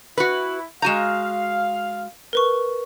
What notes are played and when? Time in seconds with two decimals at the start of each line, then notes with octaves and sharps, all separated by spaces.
0.18 E4 F#4 B4
0.82 G#3 F#4 F5 A#5 G6 D#7 E7
2.33 A#4 B4 C#6